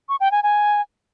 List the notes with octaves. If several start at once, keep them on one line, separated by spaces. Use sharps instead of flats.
C#6
G5
G#5
G#5